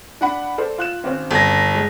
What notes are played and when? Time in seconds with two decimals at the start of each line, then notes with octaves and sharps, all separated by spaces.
0.21 D4 F#5 B5
0.58 A4 C5 D5
0.78 F4 F#6 E7
1.04 G#1 C4 C#4
1.31 G1 A#6
1.75 G#3